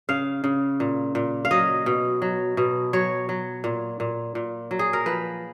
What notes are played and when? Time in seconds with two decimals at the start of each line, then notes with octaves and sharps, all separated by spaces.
0.09 C#3 F5
0.44 C#3
0.80 A#2
1.15 A#2
1.45 F5
1.51 F#3 D#5
1.86 B2
2.22 F#3
2.57 B2
2.93 F#3 C#5
3.29 F#3
3.64 A#2
4.00 A#2
4.35 A#2
4.71 F#3
4.79 G#4
4.93 A#4
5.06 F3 B4